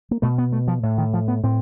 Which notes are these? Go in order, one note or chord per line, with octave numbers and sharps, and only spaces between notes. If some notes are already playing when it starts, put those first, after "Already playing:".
A#3
B2 A3
B3
A3
F3
A2
D#3
F3
B3
A2 C4